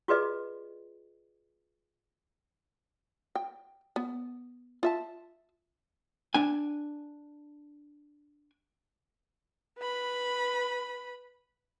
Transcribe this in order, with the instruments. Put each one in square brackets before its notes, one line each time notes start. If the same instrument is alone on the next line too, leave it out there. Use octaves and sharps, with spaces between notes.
[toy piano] F4 F#4 G#4 B4 D5 D#5
[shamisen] G5
B3
F4 E5 A5
[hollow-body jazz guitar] D4 G#5
[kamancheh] B4 B5